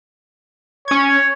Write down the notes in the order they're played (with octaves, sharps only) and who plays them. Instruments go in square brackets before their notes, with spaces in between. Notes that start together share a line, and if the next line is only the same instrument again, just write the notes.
[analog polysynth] C#4 G#6 [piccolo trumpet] C#5